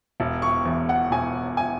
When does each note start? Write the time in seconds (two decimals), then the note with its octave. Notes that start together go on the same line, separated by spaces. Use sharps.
0.20 E1
0.42 C#6
0.65 E2
0.89 F#5
1.11 E1 G#5
1.57 G#5